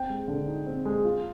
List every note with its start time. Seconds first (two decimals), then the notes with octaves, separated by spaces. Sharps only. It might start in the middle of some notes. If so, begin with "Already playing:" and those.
Already playing: C4 G5
0.10 G#3
0.28 D3
0.47 D#4
0.66 C4
0.85 G#3
1.05 F4